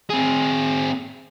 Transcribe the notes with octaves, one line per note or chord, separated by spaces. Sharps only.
C4 G#4